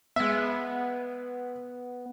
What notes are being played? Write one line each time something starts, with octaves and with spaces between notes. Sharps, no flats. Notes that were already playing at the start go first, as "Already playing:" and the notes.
G#3 B3 E5